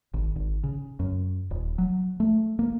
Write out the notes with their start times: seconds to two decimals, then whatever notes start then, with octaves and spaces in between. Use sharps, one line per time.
0.14 G#1
0.36 G#1
0.64 C#3
0.99 F#2
1.51 D#1
1.78 F#3
2.20 A3
2.59 A#3